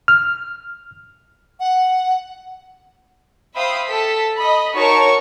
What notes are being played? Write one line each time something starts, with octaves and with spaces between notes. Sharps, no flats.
F6
F#5
C5 E5 F5 G5 B5 D#6
A4 B6
D#5 B5
D#4 F#4 A#4 C#5 A5 C#6